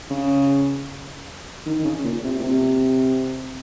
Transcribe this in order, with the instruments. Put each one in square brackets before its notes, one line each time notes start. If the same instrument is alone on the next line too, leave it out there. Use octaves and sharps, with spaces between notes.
[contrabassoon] C#3
D#3
D#3
C#3
A#2
C3
A#2
C3